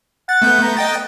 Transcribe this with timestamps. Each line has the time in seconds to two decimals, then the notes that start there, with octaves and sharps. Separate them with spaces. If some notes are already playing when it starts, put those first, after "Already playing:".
0.29 F#5 A6
0.42 A3 B3 G6
0.62 A#5
0.77 D#5 G5 A6